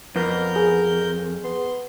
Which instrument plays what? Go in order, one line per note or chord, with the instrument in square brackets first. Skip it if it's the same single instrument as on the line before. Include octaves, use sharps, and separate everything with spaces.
[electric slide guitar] F2 [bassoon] B3 [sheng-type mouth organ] A#4 G6
[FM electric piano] G#4
[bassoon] B3 [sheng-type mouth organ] C6